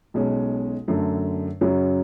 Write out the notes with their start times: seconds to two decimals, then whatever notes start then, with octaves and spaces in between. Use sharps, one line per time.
0.14 B1 B2 G#3 C#4
0.88 F#2 D3 A3
1.61 F#2 C#3 F#3 C#4